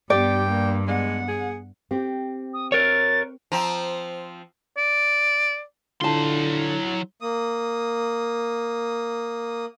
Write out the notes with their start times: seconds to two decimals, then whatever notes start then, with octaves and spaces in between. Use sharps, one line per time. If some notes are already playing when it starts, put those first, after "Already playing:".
0.10 G2 B3 G4 D5 G5
0.47 A#3
0.88 G#3 B3 F#5
1.28 G#4
1.91 C4 G4
2.53 D#6
2.72 A#4 C#5 A6
3.52 F3 C4 A#5
4.77 D5
6.01 D3 F#3 E4 F4 A5 C6
7.21 A#3 D#6